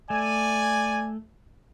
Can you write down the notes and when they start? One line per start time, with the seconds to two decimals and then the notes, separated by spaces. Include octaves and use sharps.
0.10 A3 D5 G#5